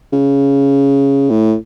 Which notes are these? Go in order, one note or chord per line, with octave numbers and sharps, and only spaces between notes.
C#3
A2